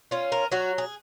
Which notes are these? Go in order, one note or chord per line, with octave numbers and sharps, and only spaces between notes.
C#4 F4
A#4
F#3 F#4
G#4